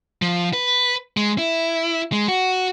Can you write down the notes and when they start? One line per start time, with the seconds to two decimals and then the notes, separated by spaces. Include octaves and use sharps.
0.22 F3
0.53 B4
1.17 G#3
1.38 E4
2.12 G#3
2.28 F#4